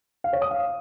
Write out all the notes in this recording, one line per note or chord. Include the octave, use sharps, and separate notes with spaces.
F5
C#5
D#6
F5